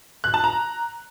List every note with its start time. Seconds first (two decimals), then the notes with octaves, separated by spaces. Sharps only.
0.24 F#6
0.34 A5
0.44 A#5